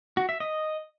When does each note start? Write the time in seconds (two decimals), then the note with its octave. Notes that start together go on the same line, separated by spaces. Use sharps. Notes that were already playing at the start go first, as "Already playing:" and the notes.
0.17 F#4
0.29 E5
0.40 D#5